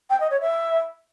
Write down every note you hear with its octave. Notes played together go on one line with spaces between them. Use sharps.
G5
D#5
C#5
E5